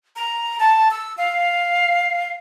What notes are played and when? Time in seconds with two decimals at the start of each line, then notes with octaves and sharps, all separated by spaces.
0.16 A#5
0.59 A5
0.91 E6
1.18 F5